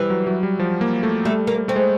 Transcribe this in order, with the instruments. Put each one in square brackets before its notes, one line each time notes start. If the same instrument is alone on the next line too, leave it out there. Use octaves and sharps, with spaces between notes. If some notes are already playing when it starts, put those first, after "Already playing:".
Already playing: [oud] E3 [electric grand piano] G3
[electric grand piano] F#3
F#3
G3
F3
A#3
A3
[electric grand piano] G3 [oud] A3
[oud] A#3
[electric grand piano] A3 [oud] C4
[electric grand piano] G#3